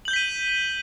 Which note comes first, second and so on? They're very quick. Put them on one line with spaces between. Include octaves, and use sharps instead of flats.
F#7 G6 G7 B6 D#7